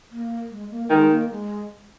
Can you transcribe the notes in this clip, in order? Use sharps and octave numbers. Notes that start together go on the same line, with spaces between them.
A#3
G#3
A#3
D#3 G#3
A#3
G#3